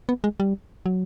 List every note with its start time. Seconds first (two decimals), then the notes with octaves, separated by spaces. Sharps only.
0.09 B3
0.24 G#3
0.40 G3
0.86 F#3